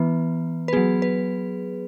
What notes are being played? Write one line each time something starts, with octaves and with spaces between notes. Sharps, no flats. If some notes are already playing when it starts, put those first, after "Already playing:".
Already playing: E3 B3 B4
B4
F#3 B3 G#4
B4